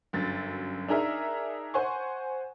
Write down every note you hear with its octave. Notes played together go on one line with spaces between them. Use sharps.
G1 F#2 A6
D4 D#4 G#4 A#4 E5
C5 F#5 G#5 C6 C#6